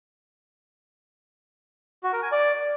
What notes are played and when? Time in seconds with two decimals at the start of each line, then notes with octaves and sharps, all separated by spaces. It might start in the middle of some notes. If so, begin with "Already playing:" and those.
2.03 F#4
2.13 A#4
2.22 G#5
2.32 D5